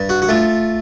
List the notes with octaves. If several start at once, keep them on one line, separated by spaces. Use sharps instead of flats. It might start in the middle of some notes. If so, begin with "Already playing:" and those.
Already playing: G2
F#4
F#4
A3 F4